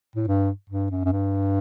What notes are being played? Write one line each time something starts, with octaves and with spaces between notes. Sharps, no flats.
A2
G2
G2
F#2
F#2
G2